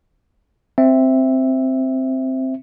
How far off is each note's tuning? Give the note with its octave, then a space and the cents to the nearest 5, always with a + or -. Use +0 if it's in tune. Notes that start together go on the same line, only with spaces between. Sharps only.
C4 +0 E5 +0